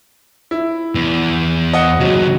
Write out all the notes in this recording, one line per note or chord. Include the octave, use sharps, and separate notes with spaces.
E4
E2
D#5 F#5
D#2 C#3 F#3